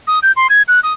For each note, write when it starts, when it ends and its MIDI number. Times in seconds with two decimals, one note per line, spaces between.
0.07 0.19 87
0.23 0.32 91
0.36 0.47 84
0.50 0.62 92
0.68 0.80 90
0.83 0.93 87